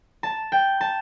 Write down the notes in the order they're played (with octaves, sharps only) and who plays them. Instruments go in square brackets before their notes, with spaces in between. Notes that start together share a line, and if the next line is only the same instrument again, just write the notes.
[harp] A5
G5
A5